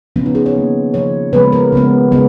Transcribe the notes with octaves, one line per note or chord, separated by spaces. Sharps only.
C#3 F3 B3 C#4
D#4
G#4
C#5
D#3 A#3
C#3 F3 B3 C#5
C#3 F3 G#3 B3 B4
A#4
C#3 G#3 B3
C#3 G#3 B3